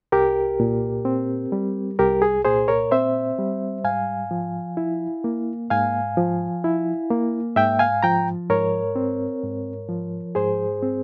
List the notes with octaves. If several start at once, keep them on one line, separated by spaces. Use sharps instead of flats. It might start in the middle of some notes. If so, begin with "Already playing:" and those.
C2 G4 A#4
A#2
C4
G3
C2 G4 A#4
G#4
A#2 G#4 C5
A#4 C#5
C4 C5 E5
G3
G#2 F5 G#5
F3
E4
A#3
G#2 F5 G#5
F3
E4
A#3
G#2 E5 G5
F5 G#5
F3 G5 A#5
G#2 A#4 C#5
C4
G#2
F3
G#2 G#4 C5
C4